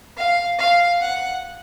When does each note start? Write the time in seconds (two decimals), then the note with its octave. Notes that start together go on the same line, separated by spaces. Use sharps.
0.17 F5
0.59 F5
1.01 F#5